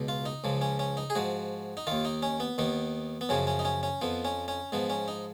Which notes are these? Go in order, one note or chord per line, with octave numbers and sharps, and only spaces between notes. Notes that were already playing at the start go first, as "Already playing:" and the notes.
Already playing: C#2 B2
F4
D#4
C#2 C#3 F3
C#4
C#4
D#4
G#4
G#2 F3 F#4
D#4
D#2 D#3 F4
D#4
C#4
B3
D#2 D#3 B3
B3
F#2 C#3 F3 C#4
C#4
D#4
C#4
C#4
F2 F3 B3
C#4
C#4
G#2 F3 B3
C#4
D#4